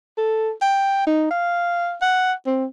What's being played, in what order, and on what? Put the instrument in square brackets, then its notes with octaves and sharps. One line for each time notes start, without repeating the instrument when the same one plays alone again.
[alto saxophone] A4
G5
D#4
F5
F#5
C4